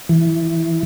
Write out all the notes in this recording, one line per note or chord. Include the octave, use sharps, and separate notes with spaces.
E3